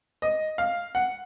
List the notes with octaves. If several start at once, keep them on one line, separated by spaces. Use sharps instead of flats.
D#5
F5
F#5